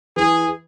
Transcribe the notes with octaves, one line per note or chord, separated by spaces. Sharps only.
E3 G#4